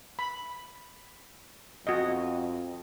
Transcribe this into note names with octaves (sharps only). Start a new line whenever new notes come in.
B5
F2 F#4 D#5